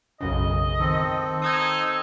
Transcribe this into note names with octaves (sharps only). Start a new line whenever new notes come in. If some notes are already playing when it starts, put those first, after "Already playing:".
B1 F#2 C#3 D#5
D#3 C4 A4
D#4 D#6 E6 G#6